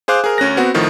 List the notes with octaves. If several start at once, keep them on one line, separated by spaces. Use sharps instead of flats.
G#4 C5 F5 D6 F#6
G#4 A#4
D2 C#4 F#6 A#6
B3 C4 F#4
A2 D#3 F3